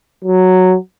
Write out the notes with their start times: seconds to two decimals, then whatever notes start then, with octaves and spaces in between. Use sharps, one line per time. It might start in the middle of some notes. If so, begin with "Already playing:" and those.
0.24 F#3